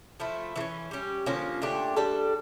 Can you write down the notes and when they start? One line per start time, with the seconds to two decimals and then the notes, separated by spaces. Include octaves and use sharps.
0.20 F3 A3 E4
0.56 E3 A3
0.60 C#4
0.91 G3 C#4 G4
1.26 D3 F3 A#3 C#4
1.62 A#2 A3 D4 G4
1.97 G3 D4 A4